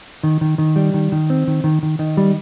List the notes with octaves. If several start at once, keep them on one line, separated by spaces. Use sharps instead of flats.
D#3
D#3
D#3
G3
D#3
D#3
C4
D#3
D#3
D#3
D#3
G3